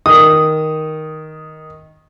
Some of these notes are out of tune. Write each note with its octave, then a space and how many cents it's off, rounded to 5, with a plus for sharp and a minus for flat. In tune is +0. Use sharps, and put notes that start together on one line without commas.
D#3 +5 D#6 +0